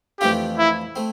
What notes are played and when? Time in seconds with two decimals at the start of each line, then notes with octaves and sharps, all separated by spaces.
0.20 F2 E3 A3 D4 F4 G4
0.58 E4
0.96 A3 C4